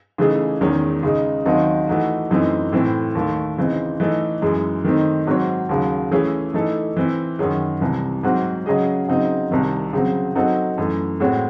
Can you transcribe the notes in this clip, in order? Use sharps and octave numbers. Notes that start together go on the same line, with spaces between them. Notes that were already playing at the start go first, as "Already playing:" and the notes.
C#3 E3 A3 D#4 G#4
E2 D#3 G#3 C#4
C#3 G#3 D#4
D#2 D#3 F#3 C4 D#4
E3 A3 D#4 F#4
F#2 E3 A3 C4 D#4
A2 E3 C4 E4 A4
D#2 D#3 A3
C#3 E3 C4 D#4
E3 A3 D#4 A4
F#2 E3 G#3
D#3 A3 C4 D#4
G#2 F#3 C4 F#4 C#5
D#2 C#3 F#3
E3 A3 C#4 E4 G#4
E3 A3 D#4 A4
E3 C4 E4
F#2 D#3 F#3 C#4 G#4
C2 C3 E3
G#2 F#3 C4 F#4
C#3 F#3 C#4 G#4 D#5
C#3 F#3 C4 D#4
C2 C3 D#3
C#3 F#3 C4
F#3 C4 D#4 F#4 A4
F#2 E3 A3
A2 G#3 C4 F#4 C#5